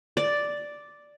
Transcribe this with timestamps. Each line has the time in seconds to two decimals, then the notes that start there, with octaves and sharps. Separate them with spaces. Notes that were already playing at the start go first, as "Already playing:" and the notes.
0.17 D5